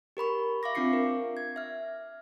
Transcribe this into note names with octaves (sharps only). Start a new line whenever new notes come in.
G4 A#4 B5 C#6
E5 F5 C#6 D6 A#6
C4 D4 F4 D6 C7 C#7
A#4
G#6
E5 F6